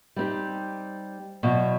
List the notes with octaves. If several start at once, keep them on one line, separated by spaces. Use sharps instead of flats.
G3 C4 D#4 G4
E2 B2 F#3